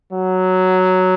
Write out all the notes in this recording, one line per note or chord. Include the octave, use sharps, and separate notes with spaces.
F#3